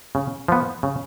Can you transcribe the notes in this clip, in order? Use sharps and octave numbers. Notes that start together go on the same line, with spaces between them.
C#3
F3 B3
C#3